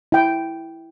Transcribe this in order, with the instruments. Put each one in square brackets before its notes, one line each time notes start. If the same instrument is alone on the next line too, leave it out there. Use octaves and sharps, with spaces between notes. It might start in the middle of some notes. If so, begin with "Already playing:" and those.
[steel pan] E4 G5